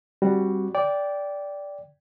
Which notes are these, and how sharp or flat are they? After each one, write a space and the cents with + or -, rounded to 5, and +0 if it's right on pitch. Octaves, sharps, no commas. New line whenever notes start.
G3 +0 C4 +25 F#4 +0
D5 -15 G5 +0